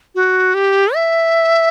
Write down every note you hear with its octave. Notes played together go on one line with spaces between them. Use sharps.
F#4
G4
E5